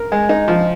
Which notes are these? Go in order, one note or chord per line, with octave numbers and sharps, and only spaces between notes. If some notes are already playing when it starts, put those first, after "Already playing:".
Already playing: A#4
G#3
D#4
F3